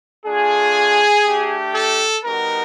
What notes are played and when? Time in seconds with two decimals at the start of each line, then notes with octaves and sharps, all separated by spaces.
0.25 A3 D4 F4 G#4
1.25 A3 D4 G4
1.75 A4
2.25 G3 B3 D#4 F#4 A#4